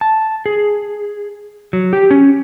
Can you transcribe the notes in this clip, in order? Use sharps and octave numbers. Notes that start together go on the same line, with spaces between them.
A5
G#4
F#3
G4
C#4